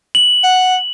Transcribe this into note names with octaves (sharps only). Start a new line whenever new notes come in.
F#7
F#5